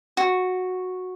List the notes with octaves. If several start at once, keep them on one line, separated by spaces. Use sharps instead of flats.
F#4